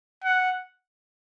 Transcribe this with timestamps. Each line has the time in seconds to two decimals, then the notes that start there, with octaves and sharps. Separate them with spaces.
0.24 F#5